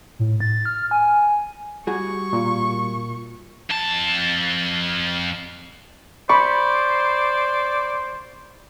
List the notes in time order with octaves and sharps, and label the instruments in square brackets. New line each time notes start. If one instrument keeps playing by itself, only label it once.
[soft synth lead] A2
A6
F6
G#5
[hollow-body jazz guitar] G3 F#4 G#4 [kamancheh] C#6
[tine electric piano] A#2
[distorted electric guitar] F2 A5
[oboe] C5 [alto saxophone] D5 [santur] B5 [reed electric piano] C#6